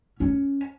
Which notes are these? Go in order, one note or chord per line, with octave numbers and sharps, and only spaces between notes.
C#4